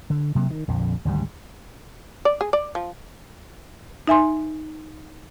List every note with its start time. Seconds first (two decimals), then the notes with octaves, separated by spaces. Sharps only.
0.10 D3
0.35 C3 F#3 A#3
0.50 D#3
0.68 A#1 F2 D3
1.05 G#1 D2 G#2 G3
2.25 D5
2.41 G#4
2.53 D5
2.75 F3
4.07 D#4 E5 G#5 C6